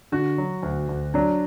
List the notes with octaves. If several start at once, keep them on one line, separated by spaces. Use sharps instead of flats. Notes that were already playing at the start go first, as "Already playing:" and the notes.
D3 F#4
F#3
D2
D2
F#3 D4